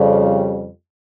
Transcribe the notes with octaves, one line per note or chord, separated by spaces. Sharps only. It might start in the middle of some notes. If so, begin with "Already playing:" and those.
Already playing: F2 C#3 G3